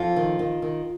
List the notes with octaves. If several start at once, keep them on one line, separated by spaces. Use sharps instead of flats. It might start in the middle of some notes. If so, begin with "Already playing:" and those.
Already playing: F2 F4
D#3
D#3
D#3